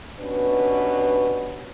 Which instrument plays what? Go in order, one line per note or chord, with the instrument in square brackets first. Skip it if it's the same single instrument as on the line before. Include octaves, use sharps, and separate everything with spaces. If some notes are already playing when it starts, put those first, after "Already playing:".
[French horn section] D#2 B2 C#4 D4 B4